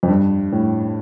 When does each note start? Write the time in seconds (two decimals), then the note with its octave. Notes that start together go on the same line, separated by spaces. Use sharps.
0.03 F2
0.08 G2
0.52 A2